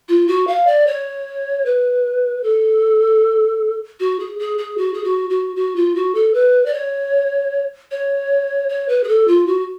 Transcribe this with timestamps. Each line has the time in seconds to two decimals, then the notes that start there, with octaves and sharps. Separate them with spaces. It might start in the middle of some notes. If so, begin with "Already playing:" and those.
0.09 F4
0.28 F#4
0.47 F5
0.67 D5
0.87 C#5
1.66 B4
2.43 A4
4.00 F#4
4.20 G#4
4.39 G#4
4.58 G#4
4.78 F#4
4.94 G#4
5.04 F#4
5.30 F#4
5.56 F#4
5.76 F4
5.95 F#4
6.15 A4
6.34 B4
6.66 D5
6.74 C#5
7.91 C#5
8.69 C#5
8.89 B4
9.04 G#4
9.08 A4
9.28 F4
9.47 F#4